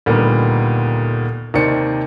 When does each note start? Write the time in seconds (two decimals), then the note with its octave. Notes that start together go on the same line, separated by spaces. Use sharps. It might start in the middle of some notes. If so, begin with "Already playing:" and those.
0.06 D2 A#2 D#3 G3 B3
1.54 D#2 C3 D#3 C5 D5 C#7